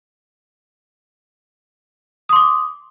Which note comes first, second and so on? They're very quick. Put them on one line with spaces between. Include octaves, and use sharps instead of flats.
D#6 C6 D6